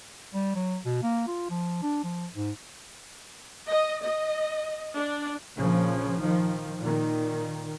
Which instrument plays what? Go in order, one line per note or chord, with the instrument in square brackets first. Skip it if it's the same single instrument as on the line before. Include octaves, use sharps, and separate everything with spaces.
[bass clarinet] G3
F#3
B2
A#3
F4
F3
D4
F3
G#2
[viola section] D#5
D#5
D4
[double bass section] A#1 C#3 F3
D#3 F3
A#2 D#3